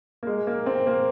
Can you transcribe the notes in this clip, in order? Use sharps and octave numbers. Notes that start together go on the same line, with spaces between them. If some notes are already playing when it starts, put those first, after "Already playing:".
A#3
G#3
A#3
C4
A#3